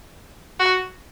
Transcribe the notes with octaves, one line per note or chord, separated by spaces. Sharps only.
F#4